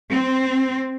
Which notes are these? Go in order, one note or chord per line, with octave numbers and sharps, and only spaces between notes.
C4